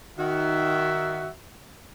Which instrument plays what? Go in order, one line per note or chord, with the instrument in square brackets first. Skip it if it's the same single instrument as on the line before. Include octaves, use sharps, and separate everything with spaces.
[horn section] D#3 F#4 E5